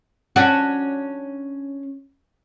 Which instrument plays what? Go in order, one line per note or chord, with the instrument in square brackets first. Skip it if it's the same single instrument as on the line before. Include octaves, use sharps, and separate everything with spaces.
[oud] C#4 D4 F#4